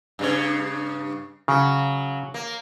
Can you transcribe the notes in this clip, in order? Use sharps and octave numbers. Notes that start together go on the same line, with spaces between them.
G2 C#3 C#5
C#3 F#3
A#3